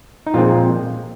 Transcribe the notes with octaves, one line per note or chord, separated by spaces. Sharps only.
D#4
A#2 F3 G#3 C4 F4